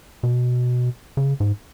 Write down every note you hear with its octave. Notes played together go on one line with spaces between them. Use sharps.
B2
C#3
G#2